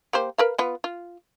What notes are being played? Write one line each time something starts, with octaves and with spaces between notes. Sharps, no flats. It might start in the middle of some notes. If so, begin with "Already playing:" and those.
A#3 G4 C5
A#4 B4 F5
B3 F4 B4
F4